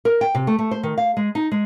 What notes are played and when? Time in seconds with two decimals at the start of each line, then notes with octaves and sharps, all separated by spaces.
0.05 A#4
0.21 G5
0.35 C3
0.47 A3
0.58 A3
0.71 C5
0.83 D#3
0.98 F5
1.17 G#3
1.35 D#4
1.52 G#3